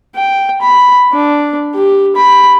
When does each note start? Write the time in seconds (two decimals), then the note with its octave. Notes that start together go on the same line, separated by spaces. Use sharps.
0.15 G5
0.61 B5
1.13 D4
1.75 G4
2.16 B5